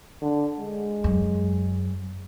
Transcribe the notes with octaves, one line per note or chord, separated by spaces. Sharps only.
D3
G#3
F#2